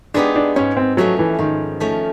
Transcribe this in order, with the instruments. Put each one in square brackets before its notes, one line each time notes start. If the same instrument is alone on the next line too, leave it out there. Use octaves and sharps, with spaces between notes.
[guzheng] G#3 B3 D#4 G4 [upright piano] D4
[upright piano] D4
[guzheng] G#2 [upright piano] C#4
[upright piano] C4
[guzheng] F3 A3 C#4 [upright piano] F#3
[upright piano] E3
[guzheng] G#2 [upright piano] D#3
[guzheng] F3 A3 C#4